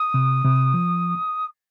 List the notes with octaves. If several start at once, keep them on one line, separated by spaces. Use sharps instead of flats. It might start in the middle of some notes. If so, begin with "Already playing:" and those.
Already playing: D#6
C3
C3
F3